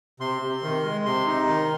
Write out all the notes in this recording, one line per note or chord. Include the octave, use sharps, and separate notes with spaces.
C3 C6
C3
D#3
G#3
C3 C6
D#4
D#3